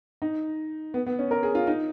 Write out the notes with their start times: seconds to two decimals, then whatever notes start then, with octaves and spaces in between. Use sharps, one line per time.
0.22 D#4
0.94 B3
1.07 B3
1.19 C#4
1.31 A#4
1.43 G#4
1.55 F4
1.67 D#4